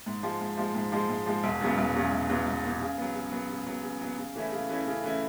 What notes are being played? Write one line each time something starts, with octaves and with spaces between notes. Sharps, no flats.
G#2
F3 G#3
G#2
F3 G#3
G#2
F3 G#3
G#2
F3 G#3
E1
E2 C#3 F#3 B3
E1
E2 C#3 F#3 B3
E1
E2 C#3 F#3 B3
E1
E2 C#3 F#3 B3
C#3
F#3 B3
C#3
F#3 B3
C#3
F#3 B3
C#3
F#3 B3
C#3
E3 A3 C#4 E4
C#3
E3 A3 C#4 E4
C#3
E3 A3 C#4 E4